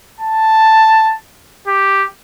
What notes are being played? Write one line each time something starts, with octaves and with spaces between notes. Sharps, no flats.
A5
G4